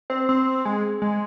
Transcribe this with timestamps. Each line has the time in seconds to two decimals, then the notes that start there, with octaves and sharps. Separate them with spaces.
0.10 C4
0.29 C4
0.65 G#3
1.02 G#3